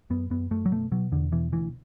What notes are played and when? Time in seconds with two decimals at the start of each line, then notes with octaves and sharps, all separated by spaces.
0.10 F#2 B3
0.30 F#2 B3
0.51 F#2 A3
0.66 F#3
0.71 B2 A3
0.92 B2 F#3
1.12 E2 D3
1.32 B2 E3
1.52 D2 E3